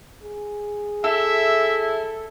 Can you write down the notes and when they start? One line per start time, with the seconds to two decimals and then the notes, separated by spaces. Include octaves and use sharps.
0.23 G#4
1.04 E4 A4 E5